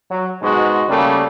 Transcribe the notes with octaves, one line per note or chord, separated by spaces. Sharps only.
F#3
G#2 B2 G#3 F#4
C#3 G3 A3 A#3